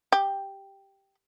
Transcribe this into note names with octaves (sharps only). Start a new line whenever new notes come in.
G4